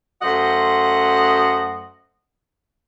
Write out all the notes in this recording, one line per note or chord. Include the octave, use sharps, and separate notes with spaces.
F#2 A3 C5 D#5 F#5